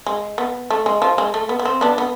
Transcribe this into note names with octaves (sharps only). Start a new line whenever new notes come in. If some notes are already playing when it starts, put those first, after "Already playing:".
G#3
B3
A3
G#3
F3
G#3
A3
B3
B3
C4
B3 D4
B3